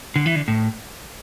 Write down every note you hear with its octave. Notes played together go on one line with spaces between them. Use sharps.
D3
E3
D3
A2